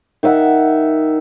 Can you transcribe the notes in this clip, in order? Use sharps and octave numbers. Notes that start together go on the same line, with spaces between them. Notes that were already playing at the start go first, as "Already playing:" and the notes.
D#3 D#4 E5 F#5